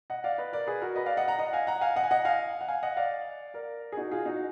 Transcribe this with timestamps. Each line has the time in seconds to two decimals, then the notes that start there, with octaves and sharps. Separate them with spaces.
0.10 D#5 F#5
0.24 D5 F5
0.38 B4 D#5
0.53 A#4 D5
0.67 G#4 B4
0.81 F#4 A#4
0.96 B4 D#5
1.06 D5 F5
1.17 D#5 F#5
1.28 F#5 A#5
1.39 D#5 F#5
1.53 F5 G#5
1.67 F#5 A#5
1.81 F5 G#5
1.96 D#5 F#5
2.04 G#5
2.11 D#5 F#5
2.25 F5 G#5
2.61 F#5
2.68 F5 G#5
2.83 D#5 F#5
2.97 D5 F5
3.54 A#4 D5
3.92 G#4
3.97 D#4 F#4
4.11 F4 G#4
4.26 D#4 F#4